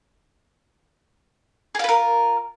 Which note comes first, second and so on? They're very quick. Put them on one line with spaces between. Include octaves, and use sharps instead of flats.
G#4 F4 B4 A#4